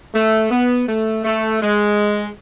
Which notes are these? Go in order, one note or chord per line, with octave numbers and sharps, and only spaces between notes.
A3
B3
A3
A3
G#3